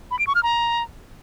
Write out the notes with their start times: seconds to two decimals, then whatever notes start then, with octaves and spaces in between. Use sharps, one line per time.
0.11 B5
0.19 D7
0.27 C#6
0.35 F6
0.43 A#5